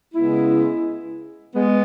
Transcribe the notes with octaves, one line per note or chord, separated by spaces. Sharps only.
C#3 G#3 B3 E4
G#3 B3